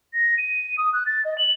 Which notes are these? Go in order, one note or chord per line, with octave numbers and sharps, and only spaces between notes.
A#6
D#7
D#6
F#6
A6
D#5
F#7